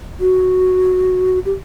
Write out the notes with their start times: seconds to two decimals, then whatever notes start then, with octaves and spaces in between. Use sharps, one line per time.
0.20 F#4
1.45 G4